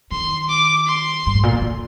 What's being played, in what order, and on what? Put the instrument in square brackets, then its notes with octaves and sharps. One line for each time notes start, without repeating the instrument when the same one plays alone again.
[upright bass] D#3 [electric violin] C6
[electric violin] D6
C6
[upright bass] G2
G#2
A#2
C3
D3